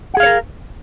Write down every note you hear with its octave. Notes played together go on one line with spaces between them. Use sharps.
G#4 A#4 C#5 F5 F#5